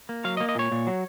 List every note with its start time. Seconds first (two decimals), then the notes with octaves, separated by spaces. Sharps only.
0.09 A#3
0.24 F#3 F5
0.37 D#5
0.40 A#3
0.49 D#5
0.55 A#2 C#5
0.72 A#2
0.87 F#3